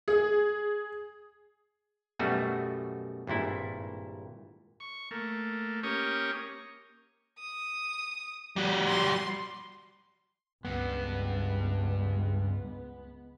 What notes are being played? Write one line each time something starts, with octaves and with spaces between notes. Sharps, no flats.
G#4
F#2 B2 G3 A3 F#4
G#1 G2 A#2 E4
C#6
A3 A#3
A#3 C#4 G4 C#6 D#6
D#6
G3 F#4
C6
C#2 G2 G#3 B3